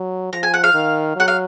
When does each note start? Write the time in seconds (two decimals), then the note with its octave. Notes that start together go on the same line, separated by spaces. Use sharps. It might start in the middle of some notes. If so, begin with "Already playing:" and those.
Already playing: F#3
0.33 F3 A#5
0.43 G#5
0.54 F#5
0.64 F5
0.74 D#3
1.15 F#3 F#5
1.28 F5